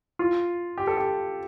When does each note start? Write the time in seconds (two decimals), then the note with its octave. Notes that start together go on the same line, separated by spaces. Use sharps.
0.19 F4
0.78 G4
0.87 A4
0.97 G4